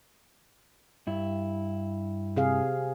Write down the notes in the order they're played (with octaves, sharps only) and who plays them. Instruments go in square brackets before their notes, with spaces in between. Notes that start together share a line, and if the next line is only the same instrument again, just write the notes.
[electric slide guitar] G2 E4
[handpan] C3 G#4 F5